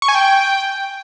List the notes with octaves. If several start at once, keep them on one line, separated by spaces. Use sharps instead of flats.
C#6
G#5
G5